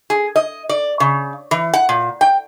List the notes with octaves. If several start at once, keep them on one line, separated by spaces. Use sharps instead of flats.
G#4
D#5
D5
C#3
E3
F#5
A#2
G5